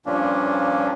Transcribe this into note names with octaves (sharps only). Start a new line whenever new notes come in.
G2 A#2 F3 A#3 C#4 D4